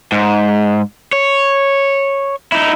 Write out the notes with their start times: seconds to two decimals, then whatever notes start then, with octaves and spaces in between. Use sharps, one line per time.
0.12 G#2
1.13 C#5
2.52 D#4 E4